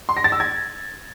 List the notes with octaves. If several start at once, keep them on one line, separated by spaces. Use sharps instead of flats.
C6
A#6
A6
E6
G#6